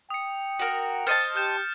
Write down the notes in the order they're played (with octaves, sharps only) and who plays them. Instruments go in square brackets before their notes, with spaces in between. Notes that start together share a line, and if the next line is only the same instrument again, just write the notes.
[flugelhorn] G5 [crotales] D#6 C#7
[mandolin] F#4 A#4
[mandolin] C5 D#5 A5 [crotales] F6 A6 C#7
[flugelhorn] G4 [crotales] F6 G6 E7